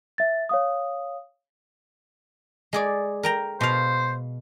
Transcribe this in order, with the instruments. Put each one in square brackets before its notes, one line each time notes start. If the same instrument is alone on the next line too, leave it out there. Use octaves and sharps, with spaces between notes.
[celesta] E5 A6
C#5 F5 D#6
[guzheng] G#3 G#4 D5
A#4 G5 A#5
[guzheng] B2 F5 [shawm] C5